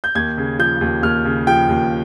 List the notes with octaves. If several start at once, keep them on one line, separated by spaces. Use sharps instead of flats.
G6
D#2 G#6
C#3
F3 G6
D#2
D#2 F6
C#3
F3 G5
D#2